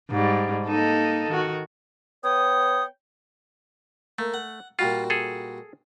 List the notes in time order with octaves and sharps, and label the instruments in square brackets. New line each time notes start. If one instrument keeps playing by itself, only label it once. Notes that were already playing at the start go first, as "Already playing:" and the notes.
[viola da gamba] G#2 G3
A#3 D#4 A4
D#3 F#4
[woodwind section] B3 C#5 G5 D#6
[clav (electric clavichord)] A3 [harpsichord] A#3
[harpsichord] F#5
[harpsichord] A#2 G3 F#4 [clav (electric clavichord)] F4
[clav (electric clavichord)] G#4 A4